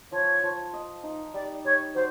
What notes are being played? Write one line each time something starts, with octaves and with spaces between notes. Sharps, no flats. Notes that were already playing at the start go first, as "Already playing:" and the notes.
F3 C#5
F3
D#5
D#4
G3 D5
G3 C#5
F#3 C5